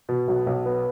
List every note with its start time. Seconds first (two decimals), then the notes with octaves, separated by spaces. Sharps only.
0.09 B2
0.28 B1
0.47 B1
0.66 B3